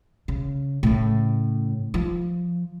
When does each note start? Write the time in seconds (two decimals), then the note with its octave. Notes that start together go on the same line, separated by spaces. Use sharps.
0.28 C#3
0.83 A2 C#3
1.94 F3